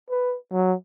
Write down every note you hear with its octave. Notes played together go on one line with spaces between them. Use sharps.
B4
F#3